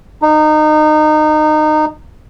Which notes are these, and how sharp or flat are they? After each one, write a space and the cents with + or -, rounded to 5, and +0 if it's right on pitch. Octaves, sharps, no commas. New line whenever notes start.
D#4 -25